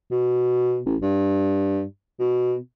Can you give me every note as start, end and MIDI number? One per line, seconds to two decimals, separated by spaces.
0.11 0.80 47
0.86 0.96 33
1.02 1.83 43
2.19 2.55 47